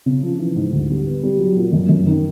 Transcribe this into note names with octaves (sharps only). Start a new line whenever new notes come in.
C#3
F3
E3
G#2
D2
G3
B3
G3
F#3
A#2
F#2
F#2
D#3